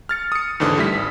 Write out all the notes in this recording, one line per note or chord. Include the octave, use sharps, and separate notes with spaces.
F6 A6 C#7
D#6 C#7
D#2 G#2 D3 E3
A2 G3 E4 B6
G#1